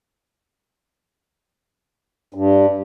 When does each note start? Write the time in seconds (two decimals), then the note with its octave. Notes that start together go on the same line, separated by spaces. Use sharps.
2.34 G2